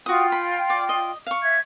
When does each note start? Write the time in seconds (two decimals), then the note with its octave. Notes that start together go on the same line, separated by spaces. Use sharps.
0.06 F4 F#4 G5 D#6
0.32 B5
0.70 D5
0.89 D#5
1.27 F5 C#6
1.42 E5 G#6